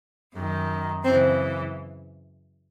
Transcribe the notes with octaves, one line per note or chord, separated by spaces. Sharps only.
F#2 D#3
F#2 C#3 E3 C4